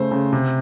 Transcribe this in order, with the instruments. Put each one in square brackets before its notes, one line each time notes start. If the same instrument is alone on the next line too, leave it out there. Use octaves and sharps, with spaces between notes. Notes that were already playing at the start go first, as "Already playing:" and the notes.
Already playing: [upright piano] C#3 A3 [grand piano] C5
[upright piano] C#3
C3